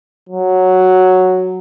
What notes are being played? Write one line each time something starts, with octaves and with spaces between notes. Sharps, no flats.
F#3